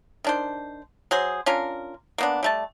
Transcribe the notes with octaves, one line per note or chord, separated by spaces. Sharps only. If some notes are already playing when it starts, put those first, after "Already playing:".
D#3 D4 C5
F#3 G#4 C5
C#4 D4 F4 A#4
A#3 B3 D4
G3 A3 A5